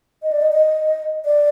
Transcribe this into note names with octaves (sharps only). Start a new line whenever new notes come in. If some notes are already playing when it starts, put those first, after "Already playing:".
D#5
D5
D#5
D#5
D5